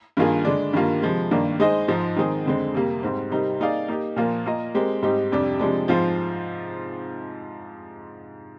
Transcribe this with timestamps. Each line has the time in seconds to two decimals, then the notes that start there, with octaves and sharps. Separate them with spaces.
0.17 G2 D#3 A#3 F4 G#4
0.45 D3 G#3 D4
0.73 G2 D#3 G3 A#3 F4
1.02 C3 F3 G#3
1.31 G2 D#3 A#3 D4
1.60 G#3 D#4 G#4 C5 D#5
1.88 G#2 F3 G#3 D#4
2.17 D#3 G#3 C4 D#4 G#4
2.46 F2 D3 G#3 C4
2.74 F2 C3 G3 A#3
3.03 G#2 G3 C4
3.31 C3 G3 C4 D#4 A#4
3.60 A#3 D#4 G#4 D5 F5
3.88 A#3 D#4 G4
4.16 A#2 F3 A#3 F4
4.46 A#3 F4 A#4 D#5
4.75 G#3 C4 G4 A#4
5.02 G#2 G3 C4 D#4 G4
5.32 F2 C3 G3 D4 G4
5.59 C3 F3 G#3 D4
5.88 G#2 F3 C4 F4 C5